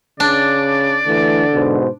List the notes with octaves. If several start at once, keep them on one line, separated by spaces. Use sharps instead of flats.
C#3 D4 D5
D3 E3 A3
G#2 B2 C5